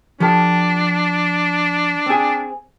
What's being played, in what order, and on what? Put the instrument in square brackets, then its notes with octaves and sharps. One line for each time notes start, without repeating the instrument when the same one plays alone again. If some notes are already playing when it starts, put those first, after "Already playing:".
[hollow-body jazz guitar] F3 G4 A4 [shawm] D4
[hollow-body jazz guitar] C4 G#4